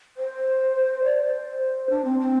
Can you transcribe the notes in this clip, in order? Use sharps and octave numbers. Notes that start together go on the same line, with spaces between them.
C5
D5
C5
D4
C4
C4